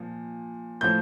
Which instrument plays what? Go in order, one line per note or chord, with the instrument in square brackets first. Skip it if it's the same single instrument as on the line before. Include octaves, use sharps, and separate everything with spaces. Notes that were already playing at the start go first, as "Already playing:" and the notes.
Already playing: [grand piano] A#2 F3
A2 F3 G6